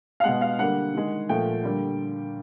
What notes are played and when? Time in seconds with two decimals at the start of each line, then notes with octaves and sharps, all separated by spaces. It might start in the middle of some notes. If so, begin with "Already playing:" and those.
0.20 F5
0.24 B2 G#3 F#5
0.41 F5
0.59 D3 G3 A#3 F#5
0.95 D#3 G#3
1.29 A#2 F3 A3 G5
1.64 D3 G3 A#3